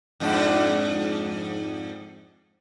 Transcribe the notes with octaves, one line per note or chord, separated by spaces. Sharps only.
F2 G#2 D4